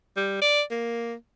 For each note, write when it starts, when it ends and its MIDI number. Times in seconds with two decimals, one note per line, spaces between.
0.17 0.41 55
0.41 0.62 74
0.71 1.14 58